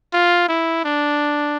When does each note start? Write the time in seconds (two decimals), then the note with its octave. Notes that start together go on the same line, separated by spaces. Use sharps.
0.13 F4
0.49 E4
0.85 D4